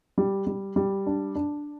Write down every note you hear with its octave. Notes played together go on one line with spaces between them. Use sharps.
G3
G3
G3
D4
D4